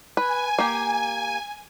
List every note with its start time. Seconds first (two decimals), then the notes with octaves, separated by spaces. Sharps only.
0.17 B4 G#5
0.59 A#3 G4